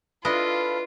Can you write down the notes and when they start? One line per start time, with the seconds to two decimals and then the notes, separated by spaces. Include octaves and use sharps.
0.25 D4 E4 F4 A4 B4 D#5 F5 B5